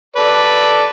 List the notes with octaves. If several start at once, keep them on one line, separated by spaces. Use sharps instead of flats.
A4 B4 D5